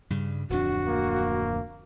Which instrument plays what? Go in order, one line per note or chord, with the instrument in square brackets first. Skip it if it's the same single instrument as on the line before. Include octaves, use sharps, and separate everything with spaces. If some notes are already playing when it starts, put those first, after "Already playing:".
[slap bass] G2 C#3 G3
[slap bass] D1 F2 D4 [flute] F#4
[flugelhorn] A#3